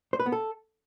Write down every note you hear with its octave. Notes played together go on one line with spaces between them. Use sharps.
C5
B4
B3
A4